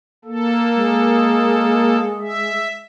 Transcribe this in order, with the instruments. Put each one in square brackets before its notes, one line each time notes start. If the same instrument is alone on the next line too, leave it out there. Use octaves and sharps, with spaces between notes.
[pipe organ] A#3 A4
[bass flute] G#3
[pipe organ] E5